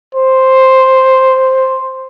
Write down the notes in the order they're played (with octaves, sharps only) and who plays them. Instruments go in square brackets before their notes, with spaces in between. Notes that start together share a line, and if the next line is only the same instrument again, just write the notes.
[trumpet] C5